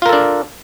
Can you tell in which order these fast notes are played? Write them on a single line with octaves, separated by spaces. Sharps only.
F4 A#4 A4 D4